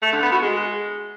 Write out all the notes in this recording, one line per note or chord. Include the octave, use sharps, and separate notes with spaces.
A3
D3
B3
F#4
G#3